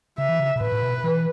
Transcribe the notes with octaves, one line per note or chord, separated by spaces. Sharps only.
C#3 E5
E3
C#3
B2
A2 B4
A2
B2
E3